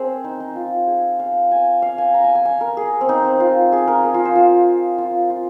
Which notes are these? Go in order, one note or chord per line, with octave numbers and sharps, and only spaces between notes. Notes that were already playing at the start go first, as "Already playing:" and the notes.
Already playing: C4 G#4 A#4 C5
D#4
D#4
F4
G#4
F5
G#5
F5
G#5
A#5
G#5
G#5
G#5
A#4
G#4
C4
D#4
C4
F4
G#4
A#4
G#4
F4
C5
F4
F4
F4